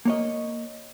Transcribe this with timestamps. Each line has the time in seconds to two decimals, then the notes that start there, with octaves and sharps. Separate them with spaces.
0.05 A#3 C#5 D#5